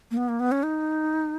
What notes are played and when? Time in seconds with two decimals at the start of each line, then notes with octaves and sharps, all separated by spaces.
0.11 A#3
0.17 B3
0.29 A#3
0.40 B3
0.52 C#4
0.63 D#4